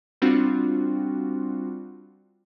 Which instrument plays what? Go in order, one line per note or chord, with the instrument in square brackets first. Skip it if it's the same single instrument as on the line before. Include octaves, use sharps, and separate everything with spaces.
[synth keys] G3 C4 D4 F4 F#4